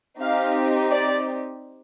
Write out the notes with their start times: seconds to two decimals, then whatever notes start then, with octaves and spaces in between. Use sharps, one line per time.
0.20 C4 D#4 G4 F5
0.91 D5